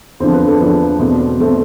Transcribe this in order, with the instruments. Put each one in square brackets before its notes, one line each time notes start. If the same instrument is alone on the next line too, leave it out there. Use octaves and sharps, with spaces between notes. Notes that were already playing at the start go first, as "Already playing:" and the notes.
[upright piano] E2 D3 F3 C4 C5
B4
A4
E2 D3 F3 B4
E2 B2 A3 C4
B2 A3 C4